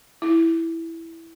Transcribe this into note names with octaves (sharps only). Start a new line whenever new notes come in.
E4